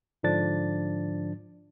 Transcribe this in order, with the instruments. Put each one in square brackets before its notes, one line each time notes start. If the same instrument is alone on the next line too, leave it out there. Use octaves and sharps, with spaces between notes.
[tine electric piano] G#2 D3 F3 D4 A6